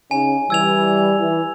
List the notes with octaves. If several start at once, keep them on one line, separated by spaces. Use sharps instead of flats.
C#3 C#4 D#4 G#5
E3 G3 E6 G#6 F7
E3